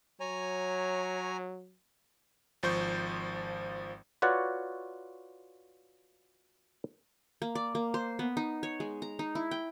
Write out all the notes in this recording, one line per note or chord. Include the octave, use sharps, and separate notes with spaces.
F#3 C#5 G#5 A#5
G#1 F3 C5 C#6 G6
F4 F#4 B4 C#5 D5 F#5
A#3
D5
A#3
C5
B3
D#4
C#5
G#3
A#5
D#4
E4
G5